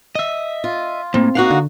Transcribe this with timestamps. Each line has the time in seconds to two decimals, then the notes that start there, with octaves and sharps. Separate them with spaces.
0.15 D#5 E5
0.64 F4
1.14 A2 A#3 C4
1.35 A#3 D#4 F#4 F5 F#5
1.51 D3